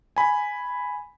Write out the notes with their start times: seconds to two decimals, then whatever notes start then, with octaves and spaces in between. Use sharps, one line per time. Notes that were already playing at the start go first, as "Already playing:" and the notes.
0.16 G#5 B5